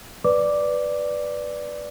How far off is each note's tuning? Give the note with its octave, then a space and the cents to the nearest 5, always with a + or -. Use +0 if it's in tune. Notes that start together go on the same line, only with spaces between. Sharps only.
B4 +0 D5 +0 D6 +0